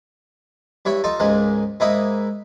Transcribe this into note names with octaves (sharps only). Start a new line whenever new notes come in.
G2 E4 C#5 B5
D#4 F4 A4
C#2 G#2 G#3 A#3
G#2 A#3 D#4 E4 B5 D#6